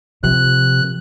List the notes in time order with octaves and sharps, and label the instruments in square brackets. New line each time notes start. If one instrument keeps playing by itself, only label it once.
[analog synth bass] C3 [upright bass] F3 [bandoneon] F#6